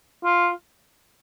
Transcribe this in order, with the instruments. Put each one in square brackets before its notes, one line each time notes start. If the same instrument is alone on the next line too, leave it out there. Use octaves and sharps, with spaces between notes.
[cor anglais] F4